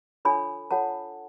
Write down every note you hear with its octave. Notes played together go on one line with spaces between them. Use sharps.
D4 F4 A4 C#5 G#5 B5
F4 A4 C#5 F#5 A5